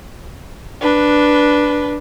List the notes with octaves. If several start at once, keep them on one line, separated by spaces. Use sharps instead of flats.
D4 B4